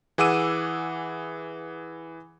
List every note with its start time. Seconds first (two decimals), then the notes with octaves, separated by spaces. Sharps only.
0.18 E3 G#4 F#5 D6 E6 D#7